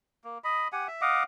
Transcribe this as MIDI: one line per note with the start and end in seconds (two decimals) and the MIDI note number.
0.24 0.38 58
0.44 0.68 75
0.44 0.68 83
0.73 0.88 67
0.73 0.88 78
0.73 0.88 80
0.88 1.01 76
1.01 1.23 75
1.01 1.23 77
1.01 1.23 78
1.01 1.23 86